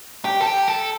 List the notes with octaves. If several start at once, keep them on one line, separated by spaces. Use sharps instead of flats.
G4
A4
G4
A4